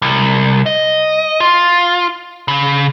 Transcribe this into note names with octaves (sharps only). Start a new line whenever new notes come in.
C2
D#5
F4
C#3